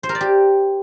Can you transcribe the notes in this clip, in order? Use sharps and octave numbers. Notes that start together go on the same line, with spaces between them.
C5
A#4
D5
G4